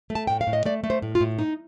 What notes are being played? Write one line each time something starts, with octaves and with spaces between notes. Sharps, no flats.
A3
A5
A2 G5
F5
A2
D#5
A3 D5
A3
C5
A2
F4
A2
D#4